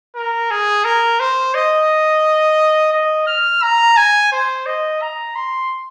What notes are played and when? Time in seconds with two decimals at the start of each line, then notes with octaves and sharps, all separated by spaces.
0.15 A#4
0.51 G#4
0.84 A#4
1.20 C5
1.54 D#5
2.93 D#5
3.27 F6
3.62 A#5
3.97 G#5
4.32 C5
4.66 D#5
5.01 A#5
5.35 C6